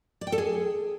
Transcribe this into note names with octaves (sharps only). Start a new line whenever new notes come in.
D5
G5
A4
G#4